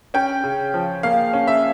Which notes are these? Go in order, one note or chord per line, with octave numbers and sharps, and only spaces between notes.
C#4 G5
C#3
F3
A#3 F5
C#4
E5